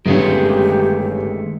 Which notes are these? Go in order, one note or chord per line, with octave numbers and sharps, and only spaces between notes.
G1 D#3 G#3 A3 C#4 G4